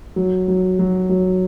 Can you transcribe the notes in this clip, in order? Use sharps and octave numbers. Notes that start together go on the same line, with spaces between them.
F#3
F#3
F#3
F#3